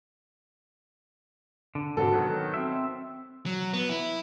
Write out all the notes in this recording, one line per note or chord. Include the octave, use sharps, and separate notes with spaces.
D3
G#2 C3 F#4 A4
D#3 F#3 B3
C4 E5
F#3
B3
E4